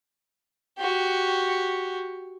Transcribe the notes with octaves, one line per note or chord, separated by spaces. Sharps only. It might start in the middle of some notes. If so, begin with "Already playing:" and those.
F#4 G4